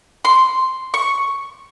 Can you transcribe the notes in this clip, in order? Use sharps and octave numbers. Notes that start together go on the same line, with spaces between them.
C6
C#6